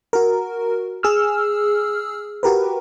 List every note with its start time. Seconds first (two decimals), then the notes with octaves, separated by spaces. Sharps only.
0.13 F#4 A#4
1.03 G#4 E6 F6
2.43 F#4 G4 A#4 B4